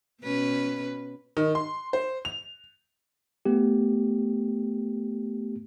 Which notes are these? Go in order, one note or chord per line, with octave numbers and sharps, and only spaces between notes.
B2 C#4 B4
D#3
C6
C5
F7
A3 B3 G4